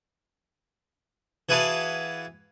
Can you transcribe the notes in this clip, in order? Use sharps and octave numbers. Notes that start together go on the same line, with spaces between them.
E3 F#4 G#4 B4 F5 A5